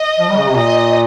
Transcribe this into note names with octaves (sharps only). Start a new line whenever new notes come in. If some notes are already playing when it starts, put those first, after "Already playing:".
Already playing: D#5
F3
G3
C#3
C3
A#2 D#5